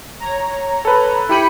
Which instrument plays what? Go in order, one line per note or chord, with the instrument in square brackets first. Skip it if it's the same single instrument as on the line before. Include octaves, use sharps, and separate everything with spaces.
[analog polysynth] C#5 A#5
[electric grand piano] A4 B4
[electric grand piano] E4 G4 D#7 [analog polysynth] G5 B5 C#7